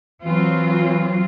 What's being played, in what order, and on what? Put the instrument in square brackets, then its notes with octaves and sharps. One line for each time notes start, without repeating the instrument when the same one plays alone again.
[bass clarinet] E3 [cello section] F#3 C4 F4